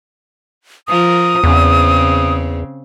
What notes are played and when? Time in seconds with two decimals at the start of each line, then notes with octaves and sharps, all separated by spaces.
0.88 F3 A#4 D#6
1.44 E2 C#3 C4